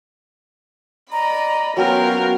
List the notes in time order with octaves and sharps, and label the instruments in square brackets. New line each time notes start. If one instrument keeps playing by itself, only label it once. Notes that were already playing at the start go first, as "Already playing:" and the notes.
[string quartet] D5 D#5 B5 [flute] A#5
[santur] F#3 [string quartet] B3 C#4 F4 [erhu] A#4 [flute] G5